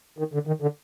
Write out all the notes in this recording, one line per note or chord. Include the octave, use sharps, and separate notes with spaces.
D#3
D3
D#3
D3